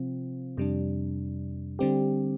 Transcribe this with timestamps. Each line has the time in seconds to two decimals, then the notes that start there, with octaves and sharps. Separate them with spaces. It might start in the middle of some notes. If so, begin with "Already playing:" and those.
Already playing: C3 F3 C4 F4
0.57 F2 C3 G3 D4
1.79 D3 G3 C4 G4